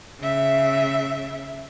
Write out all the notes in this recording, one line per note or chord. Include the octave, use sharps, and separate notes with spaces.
C#3 E5